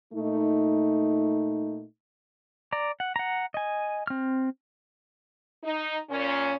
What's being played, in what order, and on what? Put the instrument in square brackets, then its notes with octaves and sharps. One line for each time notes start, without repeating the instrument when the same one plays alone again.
[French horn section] A#2 A3 D#4
[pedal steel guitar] D5 A#5
F#5
F#5 A#5
D#5 G#5
C4 F6
[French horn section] D#4
A#2 C#4